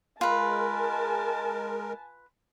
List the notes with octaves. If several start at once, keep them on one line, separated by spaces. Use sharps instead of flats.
G#3 F4 A#4 B4 G#5 A5